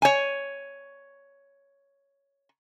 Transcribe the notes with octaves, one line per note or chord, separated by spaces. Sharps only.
C#5 G#5